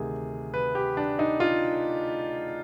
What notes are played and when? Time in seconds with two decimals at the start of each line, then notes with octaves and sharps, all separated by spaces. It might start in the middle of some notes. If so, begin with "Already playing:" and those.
Already playing: D2 C3 D#3 G#4
0.54 B4
0.75 G4
0.97 D4
1.19 D#4
1.40 F4